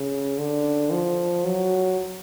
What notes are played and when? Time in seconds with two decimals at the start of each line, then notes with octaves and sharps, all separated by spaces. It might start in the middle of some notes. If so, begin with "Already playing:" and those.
Already playing: C#3
0.38 D3
0.92 F3
1.45 F#3